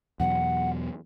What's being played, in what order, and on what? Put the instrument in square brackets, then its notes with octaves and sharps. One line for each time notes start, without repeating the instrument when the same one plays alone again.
[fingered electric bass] E2 B2 F#3 [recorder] F#5